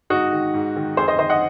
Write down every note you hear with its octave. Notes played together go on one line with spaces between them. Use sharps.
G#2 D#4 F#4
D#3
G#2
D#3
F2 G#4 C5
C5 D#5
D#3 C5 D#5
D#5 F#5